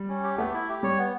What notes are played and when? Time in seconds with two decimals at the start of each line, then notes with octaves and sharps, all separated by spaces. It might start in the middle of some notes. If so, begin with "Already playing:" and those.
Already playing: G3
0.09 C#4
0.24 G4
0.38 A3 B3
0.54 E4
0.69 G4
0.83 G3 C#5
0.98 B3